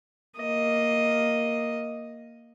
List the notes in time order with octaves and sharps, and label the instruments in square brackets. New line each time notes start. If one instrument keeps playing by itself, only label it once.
[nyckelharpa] A#3 D#5